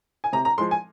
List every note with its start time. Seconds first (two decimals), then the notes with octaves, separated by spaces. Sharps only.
0.24 G#5
0.32 C3 A#5
0.45 A#5
0.58 F3 G#3 C6
0.71 G#5